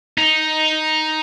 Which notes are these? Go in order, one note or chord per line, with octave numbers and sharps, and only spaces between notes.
D#4